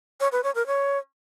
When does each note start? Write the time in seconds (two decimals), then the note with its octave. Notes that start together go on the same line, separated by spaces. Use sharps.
0.20 C#5
0.32 B4
0.43 C#5
0.55 A#4
0.67 C#5